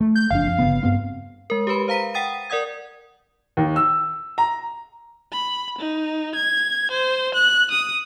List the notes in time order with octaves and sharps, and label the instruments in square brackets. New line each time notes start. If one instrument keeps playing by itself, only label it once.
[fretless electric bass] A3
[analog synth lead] G6
[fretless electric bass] F#1 F2 D4 [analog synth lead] F5
[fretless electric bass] F2
G1 C#3 B3
G2 B3 C4
[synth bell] G#3 A#4
G4 A#4 B4 B5
C5 F5 A#5 B6 D#7
F#5 G5 D#6 A6 D#7
A#4 D5 F#5 D#6 G#6
[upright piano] D#2
E6
A#5
[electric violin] B5
D#4
G#6
C5
F#6
D#6